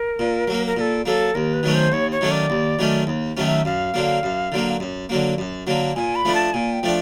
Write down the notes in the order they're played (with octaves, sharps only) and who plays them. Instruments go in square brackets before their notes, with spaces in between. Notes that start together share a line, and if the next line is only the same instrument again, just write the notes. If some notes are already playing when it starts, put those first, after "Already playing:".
Already playing: [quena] A#4
[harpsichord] A#2
F#3 A#3
[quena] A#4
[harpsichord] A#2 [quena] A#4
[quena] A4
[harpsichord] F#3 A#3 [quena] A4
[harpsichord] D#2 [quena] A#4
[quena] B4
[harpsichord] D#3 F#3 A3 C#4
[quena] C5
[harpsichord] D#2 [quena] C#5
[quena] C#5
[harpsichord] D#3 F#3 A3 C#4
[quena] D5
[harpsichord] D#2
D#3 F#3 A3 C#4
D#2
D#3 F#3 A3 C#4
[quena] E5
[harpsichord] F#2 [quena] F5
[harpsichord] D3 F#3 A#3
F#2
D3 F#3 A#3
F#2
D3 F#3 A#3
F#2
D3 F#3 A#3
[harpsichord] A#2 [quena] G#5
[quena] B5
[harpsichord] F3 A3 D4
[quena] A5
[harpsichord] A#2 [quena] G#5
[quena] G5
[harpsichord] F3 A3 D4